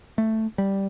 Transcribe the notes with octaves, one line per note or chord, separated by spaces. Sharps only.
A3
G3